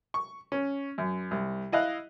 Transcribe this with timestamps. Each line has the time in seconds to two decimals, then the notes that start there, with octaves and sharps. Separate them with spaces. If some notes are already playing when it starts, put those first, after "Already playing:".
0.14 C#6
0.52 C#4
0.98 F#2
1.31 C2
1.72 E4 D#5 F5 F#6